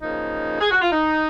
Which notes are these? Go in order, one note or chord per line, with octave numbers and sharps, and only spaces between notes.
C#3 F3 A#3 D#4
G#4
F#4
F4
D#4